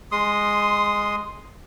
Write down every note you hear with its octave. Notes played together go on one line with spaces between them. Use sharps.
G#3 C6 D#6